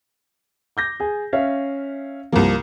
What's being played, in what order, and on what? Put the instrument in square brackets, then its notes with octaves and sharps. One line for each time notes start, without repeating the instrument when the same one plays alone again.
[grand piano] D6 G6 A#6
G#4 G#5
C#4 E5 F5
[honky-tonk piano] C2 A#3 [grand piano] F3